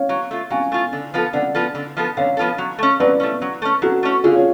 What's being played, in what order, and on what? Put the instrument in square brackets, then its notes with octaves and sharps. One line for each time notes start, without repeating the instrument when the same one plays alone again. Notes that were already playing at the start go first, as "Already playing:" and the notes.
Already playing: [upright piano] C#5 F5
[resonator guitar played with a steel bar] F#3
A3 F4
[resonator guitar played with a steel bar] F#3 [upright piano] F5 G#5
[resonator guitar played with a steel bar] A3 F4
D3
F3 B3 F4 A4
[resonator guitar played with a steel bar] D3 [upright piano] D5 F#5
[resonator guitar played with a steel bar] F3 B3 F4 A4
D3
F3 B3 F4 A4
[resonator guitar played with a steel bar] D3 [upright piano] C#5 F5
[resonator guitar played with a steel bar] F3 B3 F4 A4
F#3
A3 C#4
[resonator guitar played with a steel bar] F#3 [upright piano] B4 D5
[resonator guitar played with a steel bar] A3 C#4
F#3
A3 C#4
[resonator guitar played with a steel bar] F#3 [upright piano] F#4 A4
[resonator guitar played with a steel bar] A3 C#4
[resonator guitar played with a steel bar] D3 [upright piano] F4 G#4
[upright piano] C#5 F5